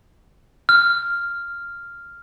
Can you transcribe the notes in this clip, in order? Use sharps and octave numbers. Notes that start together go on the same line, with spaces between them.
F6